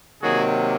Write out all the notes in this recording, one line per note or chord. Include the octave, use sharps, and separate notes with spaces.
C3 D#3 F#3 A#3 F#4 G#4